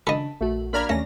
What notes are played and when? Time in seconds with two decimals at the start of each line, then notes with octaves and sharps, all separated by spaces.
0.07 C#3 D4 A4 D#5 A5 B5
0.41 A#1 A3 F#4
0.73 A#3 D4 A#5 B5 F6 G#6
0.89 D#2 A3 C#4 A#6